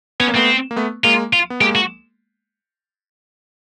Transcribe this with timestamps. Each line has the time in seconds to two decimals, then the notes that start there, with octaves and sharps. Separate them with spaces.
0.20 B3 C#4
0.28 A#3
0.35 A3 B3 C4
0.71 A#3
0.76 A3 B3
1.04 G#3 A#3 F4
1.33 F4
1.50 B3
1.61 G#3 A#3 G4
1.75 F#4